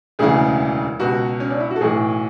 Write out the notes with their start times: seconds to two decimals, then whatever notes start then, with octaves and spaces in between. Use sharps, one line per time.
0.19 E1 D2 C#3 E3 G#4
1.00 C#2 B2 F#4
1.40 C#4
1.50 D4
1.60 E4
1.71 F#4
1.76 A4
1.80 B1 A2 E3 G#4